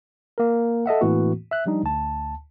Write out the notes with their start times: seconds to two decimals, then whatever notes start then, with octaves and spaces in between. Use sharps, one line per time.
0.38 A#3 A#4
0.86 A4 D#5 E5 F#5
1.01 A2 E3 A3 A#3 C4 F#4
1.51 E5 F#6
1.66 F3 G3 D4 D#4
1.83 D2 A5